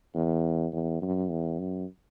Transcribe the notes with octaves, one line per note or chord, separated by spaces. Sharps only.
E2
E2
F#2
E2
F#2